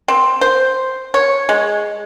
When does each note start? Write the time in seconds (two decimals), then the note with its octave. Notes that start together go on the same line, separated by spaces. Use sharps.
0.08 C4
0.41 C5
1.14 C#5
1.49 G#3